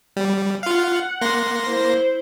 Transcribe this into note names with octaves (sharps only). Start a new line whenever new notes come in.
G3
F4 F5 F#5
A#3 C6 A#6
E4 C5